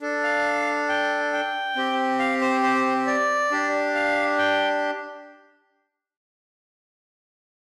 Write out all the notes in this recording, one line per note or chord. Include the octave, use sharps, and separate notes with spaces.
D4 A4
F5
G5
G5
C4 G4
F5
C5
C5
D5
D4 G4
F5
G5